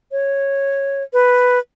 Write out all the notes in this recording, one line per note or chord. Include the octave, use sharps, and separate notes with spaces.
C#5
B4